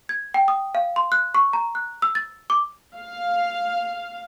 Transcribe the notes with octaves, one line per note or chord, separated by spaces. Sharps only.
G#6
G5
D#6
F5
C6
F#6
C#6
A#5
F#6
E6
A6
D6
F5